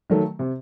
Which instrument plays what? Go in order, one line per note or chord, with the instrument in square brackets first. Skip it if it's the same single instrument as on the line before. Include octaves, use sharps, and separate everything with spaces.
[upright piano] D#3 F#3 A3
C3